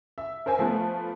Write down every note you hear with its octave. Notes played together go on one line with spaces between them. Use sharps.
E5
A#4 C5 E5 G#5
F3 A3 B3